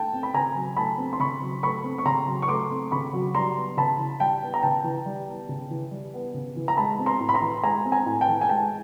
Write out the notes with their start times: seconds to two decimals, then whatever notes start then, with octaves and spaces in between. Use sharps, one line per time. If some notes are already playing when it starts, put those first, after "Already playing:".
Already playing: A3 G5 A5
0.13 C4
0.23 B5
0.34 C#3 G#5 A#5
0.55 F#3
0.77 A3 A5 B5
0.98 C4
1.13 C6
1.19 C#3 B5 C#6
1.42 F#3
1.63 A3 B5 C#6
1.84 C4
1.98 C#6
2.05 C#3 A#5 C6
2.27 F#3
2.42 C#6
2.48 A3 C6 D6
2.70 C4
2.91 C#3 B5 C#6
3.13 F#3
3.34 G3 A#5 C6
3.56 B3
3.77 C#3 A5 B5
3.99 E3
4.20 G3 G5 A5
4.42 B3
4.54 A#5
4.63 C#3 G5 A5
4.84 E3
5.06 G3
5.28 B3
5.49 C#3
5.71 E3
5.91 G3
6.14 B3
6.34 C#3
6.56 E3
6.68 A#5
6.77 G#3 A5 B5
6.99 C4
7.06 A#5 C6
7.20 A2
7.29 B5
7.34 A#5 C6
7.42 E3
7.63 G#3 G#5 A#5
7.85 C4
7.92 G#5 A#5
8.06 A2
8.21 G5 A5
8.28 E3
8.41 G#5
8.49 G#3 G5 A5